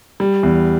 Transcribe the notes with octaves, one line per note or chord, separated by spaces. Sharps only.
G3
E2